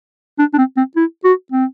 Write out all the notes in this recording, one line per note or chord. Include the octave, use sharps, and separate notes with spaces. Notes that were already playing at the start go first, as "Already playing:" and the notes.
D4
D4
C4
C4
E4
F#4
C4